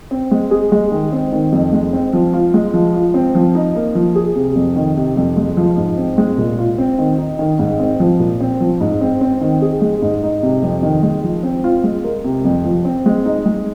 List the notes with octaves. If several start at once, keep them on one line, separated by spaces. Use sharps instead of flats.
C4
G#3
G#4
G#3
D#3
C4
D#3
F2
G#3
C4
F3
F4
G#3
F3
F4
C4
F3
D#4
A#3
F3
G#4
C3
F2
D#3
C3
F2
G#3
F3
G#2
C4
G#3
A#2
F4
C4
D#3
D#4
D#3
G#2
C4
F3
A#2
C4
F3
G#2
C4
C4
D#3
G#4
G#3
G#2
D#4
C3
F2
D#3
G#3
F3
C4
F4
G#3
A#4
C3
F2
F3
C4
G#3
D#4
G#3